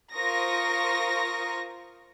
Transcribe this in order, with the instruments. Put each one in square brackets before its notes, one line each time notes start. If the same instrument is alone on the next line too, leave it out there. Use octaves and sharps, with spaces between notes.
[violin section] F4 A#4 C5 C#6 D#6 A#6